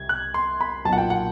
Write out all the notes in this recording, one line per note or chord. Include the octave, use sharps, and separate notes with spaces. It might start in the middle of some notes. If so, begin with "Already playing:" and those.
Already playing: C2 C3 G#6
F#6
C6
B5
B1 A#2 F#5 A5
G5
F#5